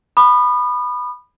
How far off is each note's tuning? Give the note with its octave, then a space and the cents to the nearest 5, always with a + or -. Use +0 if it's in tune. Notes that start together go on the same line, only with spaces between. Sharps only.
B5 +0 D#6 -35